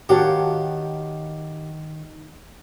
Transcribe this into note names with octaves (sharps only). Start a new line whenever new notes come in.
D#3 F#4 G4 C#5 F5 F#5 A5